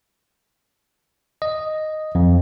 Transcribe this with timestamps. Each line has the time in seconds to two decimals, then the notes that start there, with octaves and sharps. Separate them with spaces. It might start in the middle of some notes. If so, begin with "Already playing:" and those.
1.42 D#5
2.15 F2